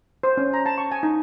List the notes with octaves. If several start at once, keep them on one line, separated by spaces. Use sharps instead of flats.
C5
C#4
A#5
A5
C#6
G#5
D#4